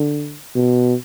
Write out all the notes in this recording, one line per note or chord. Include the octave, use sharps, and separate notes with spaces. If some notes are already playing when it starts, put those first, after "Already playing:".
Already playing: D3
B2